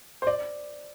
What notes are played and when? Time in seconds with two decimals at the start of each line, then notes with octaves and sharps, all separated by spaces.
0.22 C5
0.27 D5